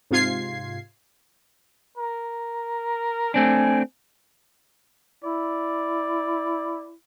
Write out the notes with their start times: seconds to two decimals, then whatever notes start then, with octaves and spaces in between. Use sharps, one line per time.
0.11 G#2 C3 F4 G#6 C7
1.98 A#4
3.34 A3 C4 D4 G#5
5.24 E4 D5